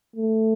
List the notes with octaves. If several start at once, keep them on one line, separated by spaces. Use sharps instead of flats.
A3